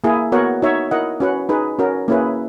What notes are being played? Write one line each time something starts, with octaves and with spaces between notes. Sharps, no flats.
A#3 E4 G#4
B3 F#4 A#4 C#5 F#5
D#4 F#4 C#5 E5
E4 A#4 D#5 F#5
C#4 F#4 B4 F#5
D#4 G#4 B4
C#4 F#4 A#4
A#3 C#4 E4 G#4 B4